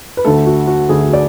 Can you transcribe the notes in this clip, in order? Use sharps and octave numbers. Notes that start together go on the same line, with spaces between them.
B4
D2 D3 A3 A4
F#4
F#4
D2 D3 A3 G#4
D5